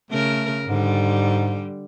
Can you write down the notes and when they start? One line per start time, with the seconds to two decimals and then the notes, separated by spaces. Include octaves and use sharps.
0.11 C#3 A3 A#4
0.67 G#2 D3 G3